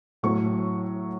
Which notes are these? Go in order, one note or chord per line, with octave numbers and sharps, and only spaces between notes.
A2 F#3 A3 C#6